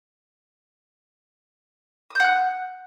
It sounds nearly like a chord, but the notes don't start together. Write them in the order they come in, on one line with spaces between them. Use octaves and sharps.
D#6 G6 F#5 F#6